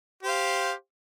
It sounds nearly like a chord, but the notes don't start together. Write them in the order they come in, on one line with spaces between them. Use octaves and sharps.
G4 C5 F5